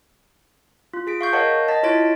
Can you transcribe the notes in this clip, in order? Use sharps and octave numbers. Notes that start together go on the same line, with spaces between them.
F4
G#4 B6 D7
F5 C#6 G6
A#4 C#5 D#5 F5 F#5 A5
D#5 A5 A6 B6
E4 F4 C#5 A6 B6 D7